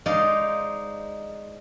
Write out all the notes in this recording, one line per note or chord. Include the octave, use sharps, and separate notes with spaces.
G#3 D#4 C5 D5 F5